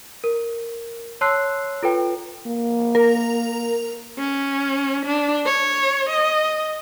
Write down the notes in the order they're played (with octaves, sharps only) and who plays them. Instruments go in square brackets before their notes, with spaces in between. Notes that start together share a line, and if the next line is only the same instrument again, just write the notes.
[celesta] A#4
C#5 A5 C6 E6 F#6 C7
F4 A4 B4 G5
[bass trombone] A#3
[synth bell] A#4
[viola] C#4
D4
C#5
D#5